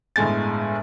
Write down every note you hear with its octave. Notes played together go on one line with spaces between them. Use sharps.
G1 A2 G#3 G#5 A6